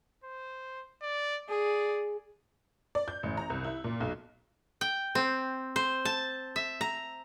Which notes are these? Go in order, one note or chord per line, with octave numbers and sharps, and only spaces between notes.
C5
D5
G#4 D5
D5
G6
A1
A#5
C2
E4
A#2
B1
G5
C4
C5
A5
E5
A#5